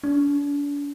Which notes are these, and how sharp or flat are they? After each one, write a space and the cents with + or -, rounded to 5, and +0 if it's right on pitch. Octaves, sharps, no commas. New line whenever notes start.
D4 -40